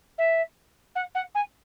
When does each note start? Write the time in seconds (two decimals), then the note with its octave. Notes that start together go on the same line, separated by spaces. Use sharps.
0.18 E5
0.95 F#5
1.15 F#5
1.35 G#5